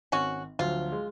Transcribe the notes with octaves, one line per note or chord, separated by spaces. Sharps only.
G#1 C#4 F#4
D2 F3 F#3 F4
G#3